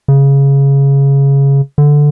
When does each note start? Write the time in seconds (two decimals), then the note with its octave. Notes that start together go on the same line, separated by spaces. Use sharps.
0.08 C#3
1.78 D3